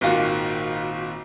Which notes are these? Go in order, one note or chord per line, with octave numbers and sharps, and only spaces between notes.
G#1 A#2 D#3 F4 F#4